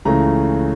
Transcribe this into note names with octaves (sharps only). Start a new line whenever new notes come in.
C#2 C#3 E3 A3 A#5